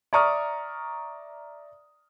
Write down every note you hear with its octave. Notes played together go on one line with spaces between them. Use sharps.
D5 E5 A#5 C#6 D#6 F6